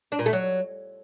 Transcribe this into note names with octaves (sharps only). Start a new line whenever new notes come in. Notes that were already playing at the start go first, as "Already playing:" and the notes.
D4
A#2
A3
F#3